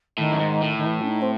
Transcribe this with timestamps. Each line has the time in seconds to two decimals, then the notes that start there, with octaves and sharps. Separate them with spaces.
0.18 A2 D#3
0.32 F#2
0.40 G#2
0.62 A2
0.77 D#3
0.85 E3
1.01 C#4
1.07 D#4
1.21 C4